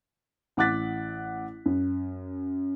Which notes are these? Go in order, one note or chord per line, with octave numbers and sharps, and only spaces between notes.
A1 F#5 D6 F#6 A6 B6
F#2